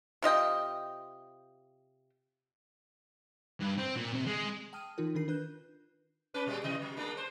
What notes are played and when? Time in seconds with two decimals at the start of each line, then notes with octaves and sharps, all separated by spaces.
0.22 C3 F4 D#5 G5
3.61 G2
3.78 C4
3.97 A#2
4.15 C3
4.27 G#3
4.73 G5 A5 D#6 F6 D#7
4.98 E3 D#4 F4 A#4
5.15 D#3 D4 A#4 C7
5.28 D4 B4 F#6 G6
6.34 C#4 B4
6.46 A#2 G3 G#3
6.64 C3 E3 D#5
6.82 F#3
6.96 G#3 A#3 D4
7.17 C5